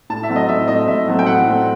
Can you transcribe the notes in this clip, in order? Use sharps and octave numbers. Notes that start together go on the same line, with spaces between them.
A2 A5
E5
F#3 A3 C4
D#5
A2 E5
F#3 A3 C4 D#5
A2 E5
F#3 A3 C4
G5
A2 F#5
F#3 A3 C4